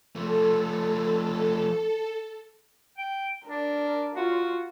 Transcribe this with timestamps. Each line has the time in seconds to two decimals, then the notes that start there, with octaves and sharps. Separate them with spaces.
0.16 F3 A3 A4
2.98 G5
3.47 D4 A#4
4.15 F4 F#4